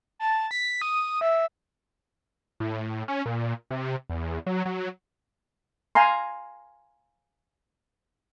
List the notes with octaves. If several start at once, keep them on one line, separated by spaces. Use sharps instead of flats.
A5
B6
D#6
E5
A2
C#4
A#2
C3
E2
F#3
F#3
F5 G#5 A#5 C6